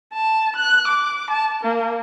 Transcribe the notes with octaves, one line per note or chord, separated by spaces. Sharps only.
A5
F#6
D6
A5
A#3